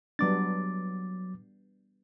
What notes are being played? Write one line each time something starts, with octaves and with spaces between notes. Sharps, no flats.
F#3 G3 B3 D4 D6 A6